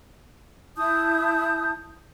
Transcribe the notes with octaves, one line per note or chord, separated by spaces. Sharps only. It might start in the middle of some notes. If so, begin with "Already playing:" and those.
E4 A5 D#6 G6